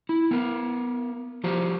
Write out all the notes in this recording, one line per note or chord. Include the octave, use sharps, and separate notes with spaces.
E4
B3 A#4
F3 F#4 G4 C5